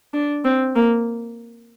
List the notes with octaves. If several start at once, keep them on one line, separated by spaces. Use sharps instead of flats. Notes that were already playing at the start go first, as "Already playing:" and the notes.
D4
C4
A#3